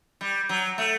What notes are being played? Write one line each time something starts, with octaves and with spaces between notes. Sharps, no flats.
G3
F#3
A3